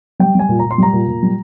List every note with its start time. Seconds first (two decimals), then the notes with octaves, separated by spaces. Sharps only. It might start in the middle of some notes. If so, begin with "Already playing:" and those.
0.20 G3 G5
0.35 G3 G#5
0.49 A#2
0.59 A#2 A#5
0.71 C6
0.78 G3 A#5
0.93 A#2
1.08 A#2
1.23 G3